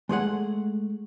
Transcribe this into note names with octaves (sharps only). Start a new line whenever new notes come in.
G#3 A3 G#4 F#5